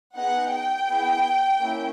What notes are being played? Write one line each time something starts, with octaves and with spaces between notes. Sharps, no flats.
B3 D#4 G#4 F#5
G5
B3 E4 G#4
A#3 C#4 E4